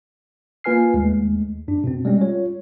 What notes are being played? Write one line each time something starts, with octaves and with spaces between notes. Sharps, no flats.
A#3 F4 B4 G#5 F6 C7
D#2 G#3 A3
F#2 D4
B2 C4
G3 G#3 C#4
F4 C#5